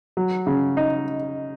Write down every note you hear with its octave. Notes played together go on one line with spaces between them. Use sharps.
F#3
C#3
D#4